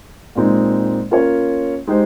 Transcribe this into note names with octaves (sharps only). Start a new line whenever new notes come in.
A#2 G#3 C4 D#4
A#3 C#4 F4 A#4 C#5
G#3 D#4 G4 C5